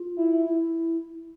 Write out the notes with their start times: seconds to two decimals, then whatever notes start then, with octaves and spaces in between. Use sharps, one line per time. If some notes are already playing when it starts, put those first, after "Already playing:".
Already playing: F4
0.17 E4
0.45 E4